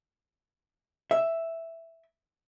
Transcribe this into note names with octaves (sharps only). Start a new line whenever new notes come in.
E5